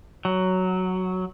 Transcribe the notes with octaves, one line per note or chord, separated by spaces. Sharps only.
F#3